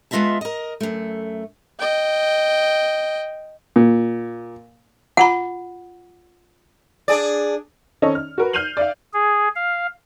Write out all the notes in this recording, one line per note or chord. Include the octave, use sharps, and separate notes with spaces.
G#3 B3 F4 D#5 E5 A5
A#4 D#5
F#2 A3
D#5 G5
A#2
F4 F#5 A#5 B5
D4 G#4 D5
D#3 C4 C#4 A4 C#5 D#5
F6
F#4 A#4 B4
F6 G6 C7 D#7 F7 F#7
D5 E5 F5
G#4
F5